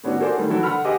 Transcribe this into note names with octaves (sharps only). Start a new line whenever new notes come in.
A2 D#3 B3 C#4 D4 F#4
A#3 F#4 G#4 A4 C5 D5
D#3 G3 A3 D4
E3 F#3 E4 F#4 A4
D3 F#5 B5 F6
G4 G#4 D#5 F#5 D6